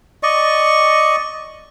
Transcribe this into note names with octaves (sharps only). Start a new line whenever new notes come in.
D5 D#5 C#6